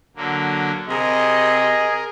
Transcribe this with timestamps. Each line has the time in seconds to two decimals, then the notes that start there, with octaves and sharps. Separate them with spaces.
0.16 D3 F#3 A#3
0.89 C3 G#4 A#4 D#5